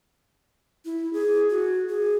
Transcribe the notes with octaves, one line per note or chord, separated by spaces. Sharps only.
E4
G#4
F#4
G#4